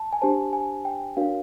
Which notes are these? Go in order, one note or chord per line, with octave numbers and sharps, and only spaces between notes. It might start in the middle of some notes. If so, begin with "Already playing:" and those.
Already playing: A5
G#5
D4 G4 C5 A5
G#5
G5
D4 F#4 A#4 C#5 F5